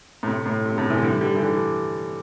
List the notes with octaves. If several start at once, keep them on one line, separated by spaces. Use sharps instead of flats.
A2
C3
A2
C3
A2 D3
C3 E3
D3 G3
D3 G3
E3
D3 G3